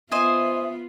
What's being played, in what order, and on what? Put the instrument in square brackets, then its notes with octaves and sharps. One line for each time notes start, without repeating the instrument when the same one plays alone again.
[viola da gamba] B3 F4 [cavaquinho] C5 D#5 G#5 [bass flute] E5